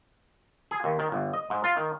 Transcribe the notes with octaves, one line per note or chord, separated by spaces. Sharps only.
G#4
D#2
D#3
G1
D#5
G#2
F4
D#3